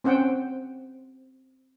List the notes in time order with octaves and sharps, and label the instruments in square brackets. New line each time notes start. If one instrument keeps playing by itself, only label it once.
[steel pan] C4 C#4 C5 F#5 G5